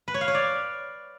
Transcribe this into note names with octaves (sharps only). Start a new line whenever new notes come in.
B4
C#5
F5
C#5
D5